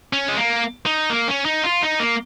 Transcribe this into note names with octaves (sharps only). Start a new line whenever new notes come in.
C#4
G#3
A#3
D#4
A#3
C#4
D#4
F4
D#4
A#3